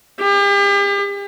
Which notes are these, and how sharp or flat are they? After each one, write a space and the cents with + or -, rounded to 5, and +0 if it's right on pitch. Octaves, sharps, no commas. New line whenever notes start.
G4 +40